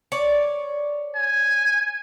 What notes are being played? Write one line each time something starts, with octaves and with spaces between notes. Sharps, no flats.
C#5 D5
G#5